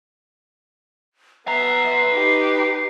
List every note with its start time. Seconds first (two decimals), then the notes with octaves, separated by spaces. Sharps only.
1.48 B3 B4 E5 A#5 C7
2.13 D#4 G4